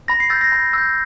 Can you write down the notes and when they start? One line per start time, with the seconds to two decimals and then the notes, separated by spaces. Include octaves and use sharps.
0.08 B5 A#6
0.20 C7
0.30 E6 G6 A6
0.41 A#6
0.52 B5
0.73 E6 G6